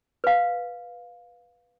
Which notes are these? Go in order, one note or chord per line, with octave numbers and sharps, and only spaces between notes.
B4 F5